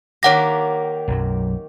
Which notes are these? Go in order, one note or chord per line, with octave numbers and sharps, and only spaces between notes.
D#3 A#3 G4 C#5 F#5 A#6
B1 F#2 F#3